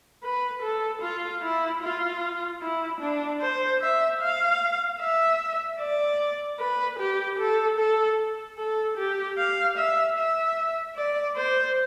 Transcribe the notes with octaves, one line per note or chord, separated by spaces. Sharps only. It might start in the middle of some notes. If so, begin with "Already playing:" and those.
B4
A4
F4
E4
F4
E4
D4
C5
E5
F5
E5
D5
B4
G4
A4
A4
A4
G4
F5
E5
E5
D5
C5